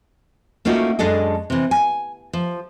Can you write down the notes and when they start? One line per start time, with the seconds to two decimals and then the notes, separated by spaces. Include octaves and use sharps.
0.65 A3 A#3 C#4 D#4 F4 F#4
0.99 F#2 G#3 D4 A4 D#5
1.50 C3 E3
1.71 G#5
2.33 F3